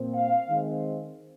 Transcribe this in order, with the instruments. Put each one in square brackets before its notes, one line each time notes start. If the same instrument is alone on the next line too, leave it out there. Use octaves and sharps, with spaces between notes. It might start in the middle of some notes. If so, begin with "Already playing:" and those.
Already playing: [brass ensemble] A#2 F3 C4
F5
D#3 G#3 C4